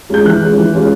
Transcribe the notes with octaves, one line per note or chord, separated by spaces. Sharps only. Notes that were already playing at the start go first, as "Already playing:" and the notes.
G#3 C#4 F4 G6
E3 F#6
G#3 C#4 F4
E3
G#3 C#4 F4